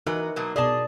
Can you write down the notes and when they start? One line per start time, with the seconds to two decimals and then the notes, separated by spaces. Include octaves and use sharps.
0.06 E3 D#4 F#4 A#4 D#5
0.36 B2 F#3 A#3
0.56 B2 G#4 D5 D#5 A5